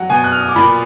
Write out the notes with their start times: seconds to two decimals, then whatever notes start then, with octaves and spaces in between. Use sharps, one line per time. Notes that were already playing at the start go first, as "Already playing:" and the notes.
Already playing: F#3 F#5
0.09 B2 G#5
0.24 F#6
0.32 F6
0.40 D#6
0.48 D6
0.56 A#2 B5